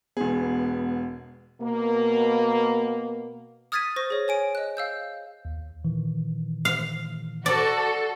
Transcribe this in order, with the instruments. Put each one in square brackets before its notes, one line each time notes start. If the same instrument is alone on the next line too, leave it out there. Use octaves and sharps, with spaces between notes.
[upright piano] E1 G#4 [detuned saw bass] B3
[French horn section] B2 A#3
[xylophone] D#6 F6 G#6 A6 B6 D#7
C5 C#6 A#6
G#4 C#5
C#5 G#5 D7
D#5 F#6
F5 E6 G6
[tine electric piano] D#2
A#2 D#3 E3
[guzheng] F5
[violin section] F#4 A4 [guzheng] D5